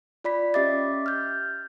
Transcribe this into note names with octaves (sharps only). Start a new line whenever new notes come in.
F4 D5 B5 B6
C#4 G4 D#5 E5 D6 A6
F6 G6